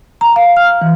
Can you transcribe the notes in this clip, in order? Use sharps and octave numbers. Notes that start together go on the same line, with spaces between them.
A#5
F5
F6
E3